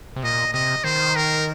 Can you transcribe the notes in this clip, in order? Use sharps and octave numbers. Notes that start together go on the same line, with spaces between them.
C3
A#2 D#5
C3 D#5
D#3 C5
A#4